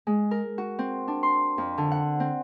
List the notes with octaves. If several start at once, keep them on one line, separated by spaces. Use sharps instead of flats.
G#3
A#4
F#4
C4
D4
C6
F2
D3
F#5
C4